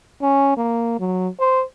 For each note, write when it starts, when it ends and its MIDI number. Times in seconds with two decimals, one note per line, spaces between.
0.22 0.57 61
0.57 0.97 58
1.00 1.28 54
1.40 1.63 72